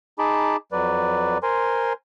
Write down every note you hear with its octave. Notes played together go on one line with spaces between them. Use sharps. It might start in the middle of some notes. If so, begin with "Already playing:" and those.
D#4 G#4 A5 B5 D6
F2 F#3 B4 D5
A#4 C5 G#5 C6